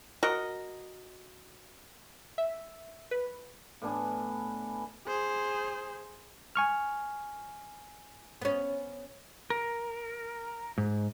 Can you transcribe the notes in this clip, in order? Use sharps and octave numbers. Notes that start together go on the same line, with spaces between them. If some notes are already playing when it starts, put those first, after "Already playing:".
F#4 A#4 D#5
E5
B4
A2 B3 D4 G#5
G#4 C5
G#5 C#6 F6
B3 C#4
A#4
G#2